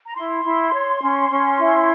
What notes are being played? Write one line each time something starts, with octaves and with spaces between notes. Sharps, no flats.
A#5
E4 C6
E4
C#5
C#4
C#4
E4